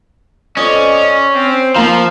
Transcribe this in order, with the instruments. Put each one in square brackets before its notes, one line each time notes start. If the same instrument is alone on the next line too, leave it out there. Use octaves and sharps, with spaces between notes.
[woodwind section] F2 D5 D#5 [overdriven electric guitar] C#4
[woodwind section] C4
[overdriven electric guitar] F3 [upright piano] A#3 A#5 [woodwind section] F5 C6